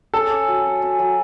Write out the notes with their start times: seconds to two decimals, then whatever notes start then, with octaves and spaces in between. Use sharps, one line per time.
0.14 C#4 A4
0.32 C#4
0.48 F#3
0.65 C#4
0.82 C#4
0.99 F#3